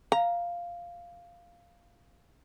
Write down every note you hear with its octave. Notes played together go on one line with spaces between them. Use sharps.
F5 A#5